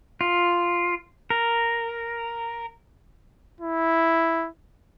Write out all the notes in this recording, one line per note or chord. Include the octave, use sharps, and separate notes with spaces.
F4
A#4
E4